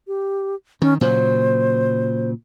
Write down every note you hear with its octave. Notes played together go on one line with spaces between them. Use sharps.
G4
D#3 C#4
A#2 C#3 F#3 C5